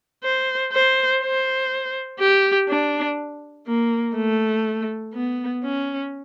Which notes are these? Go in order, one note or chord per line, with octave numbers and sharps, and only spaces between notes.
C5
C5
C5
G4
D4
A#3
A3
B3
C#4